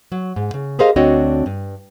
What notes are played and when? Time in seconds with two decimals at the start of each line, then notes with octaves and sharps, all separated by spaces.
0.12 F#3
0.36 G#2
0.54 C#3
0.79 G4 G#4 A#4 C5 D#5 F5
0.96 D2 C4 D4 F#4 C#5 D#5
1.46 G2